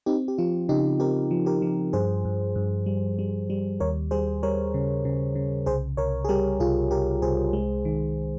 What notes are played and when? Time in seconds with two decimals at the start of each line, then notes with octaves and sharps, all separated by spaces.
0.06 C4 D#4 G4
0.28 G4
0.38 F3 F4
0.69 C#3 D#4 G4
1.00 C4 G4 A#4
1.31 F3
1.46 G4 A#4
1.62 F3
1.93 G2 G#4 C5
2.25 G2
2.56 G2
2.86 G3
3.19 G3
3.50 G3
3.80 D#2 A#4 C#5
4.11 G3 G#4 C5
4.43 G3 A#4 C#5
4.74 C#3
5.05 C#3
5.35 C#3
5.66 C2 G#4 C5
5.97 C2 A#4 C#5
6.25 G#4
6.29 G3 G4 A#4
6.60 C2 F4 G#4
6.91 C2 G4 A#4
7.22 C2 G#4 C5
7.53 G#3
7.85 D#3